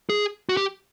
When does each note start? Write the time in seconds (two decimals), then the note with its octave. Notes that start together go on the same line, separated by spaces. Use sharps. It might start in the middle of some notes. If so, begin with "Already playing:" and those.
0.10 G#4
0.49 F#4
0.57 G4